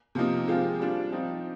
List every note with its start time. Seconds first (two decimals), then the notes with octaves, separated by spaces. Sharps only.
0.15 C3 F3 A#3 D#4
0.48 F3 G#3 C4 F4
0.80 G3 D4 F4
1.12 F3 C4 D#4